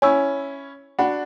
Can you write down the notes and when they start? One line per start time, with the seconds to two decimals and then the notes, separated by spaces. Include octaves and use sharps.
0.02 C#4 E4 C#5 G#5 C#6 E6
0.99 D4 F#4 F#5 B5 F#6